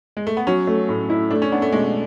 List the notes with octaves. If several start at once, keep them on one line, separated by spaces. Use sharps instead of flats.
G#3
A3
B3
F#3 C#4
A3
A2
E4
A3 D4
C#4
B3 D4
A3
B2 G#3